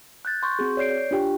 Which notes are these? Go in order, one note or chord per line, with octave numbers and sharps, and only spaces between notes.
F#6 G6 A6
C6 C#6 G6
C4 F#4 G#4
C#5 D5 G6 C7 D7
D4 F4 G4 G5